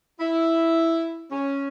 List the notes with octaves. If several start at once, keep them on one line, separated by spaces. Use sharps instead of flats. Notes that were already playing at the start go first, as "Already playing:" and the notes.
E4
C#4